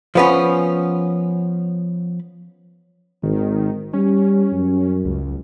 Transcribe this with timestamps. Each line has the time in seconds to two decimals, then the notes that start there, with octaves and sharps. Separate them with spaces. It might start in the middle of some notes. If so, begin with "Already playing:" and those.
0.15 F3 B3 C#4
3.23 G#1 D#3
3.93 G3 C#4
4.52 F#2
5.05 C#2